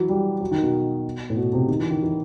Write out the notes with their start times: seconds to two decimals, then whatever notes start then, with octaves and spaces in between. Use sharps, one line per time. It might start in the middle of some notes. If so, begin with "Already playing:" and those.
Already playing: E3 F#3
0.09 G3
0.40 F#3
0.51 D#3
0.63 B2
1.30 A2
1.36 B2
1.53 C3
1.68 D#3
1.80 E3
1.91 D#3
2.03 E3